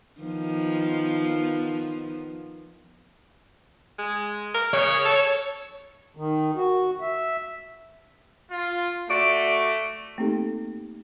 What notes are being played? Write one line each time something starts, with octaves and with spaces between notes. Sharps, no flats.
D#3 F3 B3
G#3
A#4
C#3 C#5
A4
D#3
F#4
E5
F4
A3 F#4 D5
A3 A#3 C4 D#4 G4 A4